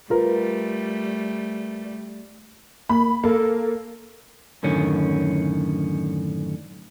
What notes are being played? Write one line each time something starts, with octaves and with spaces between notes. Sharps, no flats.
G3 A3 F4 A#4 B4
A#3 B5
A#3 A4
F#2 A2 D3 D#3 C#4